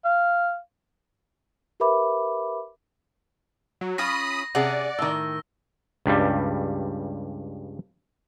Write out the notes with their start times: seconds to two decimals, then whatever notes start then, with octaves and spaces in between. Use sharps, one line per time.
0.05 F5
1.80 G4 A#4 B4 E5 B5 D6
3.81 F#3
3.98 C#4 F4 B5 D#6 A#6
4.55 C3 C#4 G#4 D5 F#5
4.99 A2 D#3 E6
6.06 C#2 G2 G3